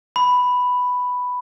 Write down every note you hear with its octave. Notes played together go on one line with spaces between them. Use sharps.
B5